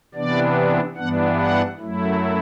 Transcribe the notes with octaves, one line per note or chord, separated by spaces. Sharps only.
C3 E3 B3 D4 D5
G2 E3 B3 D4 F#5
F#5
F#2 F#3 A3 E4